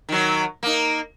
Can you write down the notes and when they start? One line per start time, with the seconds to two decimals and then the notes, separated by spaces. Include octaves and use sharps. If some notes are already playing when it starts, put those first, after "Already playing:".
0.09 D#3 F#3
0.63 A#3 D#4